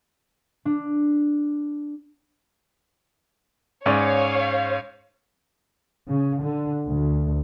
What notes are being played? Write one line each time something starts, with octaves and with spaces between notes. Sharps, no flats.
D4
G#2 C#4 C#5 D5 F5
C#3
D3
D2